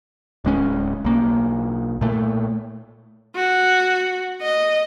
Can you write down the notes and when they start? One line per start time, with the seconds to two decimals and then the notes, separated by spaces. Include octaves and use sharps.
0.45 D1 G#3 C#4
1.04 B1 A#3
2.01 A#2 A3
3.36 F#4
4.42 D#5